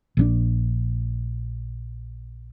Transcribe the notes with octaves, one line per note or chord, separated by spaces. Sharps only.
A#1 C#3 D4